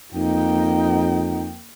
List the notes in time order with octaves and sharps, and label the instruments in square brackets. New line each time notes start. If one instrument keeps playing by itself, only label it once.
[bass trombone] F2 [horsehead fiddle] A#3 G5 [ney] D#4